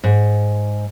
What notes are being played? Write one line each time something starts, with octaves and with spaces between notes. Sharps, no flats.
G#2